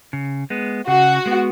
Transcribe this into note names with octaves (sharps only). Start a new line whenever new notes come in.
C#3
G#3 B3
C#3 F#4
G#3 B3